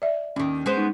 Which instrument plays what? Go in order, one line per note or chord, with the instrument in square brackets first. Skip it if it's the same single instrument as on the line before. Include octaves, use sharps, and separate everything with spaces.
[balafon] D5 E5
[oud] D#2 D#3 [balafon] C#4
[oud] G#3 B3 C5
[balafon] D#4